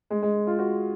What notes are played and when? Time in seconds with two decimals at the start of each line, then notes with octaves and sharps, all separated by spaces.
0.10 G#3
0.22 G#3
0.47 F4
0.59 F#4